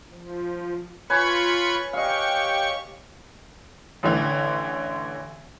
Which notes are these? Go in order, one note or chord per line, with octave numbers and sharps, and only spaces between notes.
F3
F4 B4 C#5 G#5 B5 C#6
G4 D#5 F5 C#6
A1 D3 E3